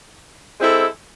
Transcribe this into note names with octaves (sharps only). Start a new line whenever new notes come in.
G#3 C4 E4 A4